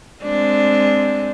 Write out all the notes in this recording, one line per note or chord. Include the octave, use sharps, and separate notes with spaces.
G#3 C4 D4